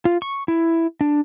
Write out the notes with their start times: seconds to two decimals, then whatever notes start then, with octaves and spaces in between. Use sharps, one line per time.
0.05 F4
0.22 C#6
0.48 E4
1.01 D4